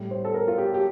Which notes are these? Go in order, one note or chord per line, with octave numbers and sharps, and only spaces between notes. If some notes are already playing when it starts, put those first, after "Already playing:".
Already playing: A2 G3
C5
A4
A#4
F4
G4
G4